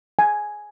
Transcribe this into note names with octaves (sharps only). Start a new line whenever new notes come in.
G#5